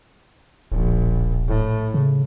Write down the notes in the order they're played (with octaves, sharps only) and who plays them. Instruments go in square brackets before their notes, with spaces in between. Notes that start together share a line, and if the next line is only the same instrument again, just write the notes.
[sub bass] D1 [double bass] A#1
[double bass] A2
[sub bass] C#3